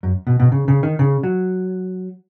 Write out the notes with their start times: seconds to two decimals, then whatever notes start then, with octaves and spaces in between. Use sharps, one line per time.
0.03 F#2
0.27 B2
0.40 B2
0.52 C#3
0.68 C#3
0.83 D#3
0.99 C#3
1.23 F#3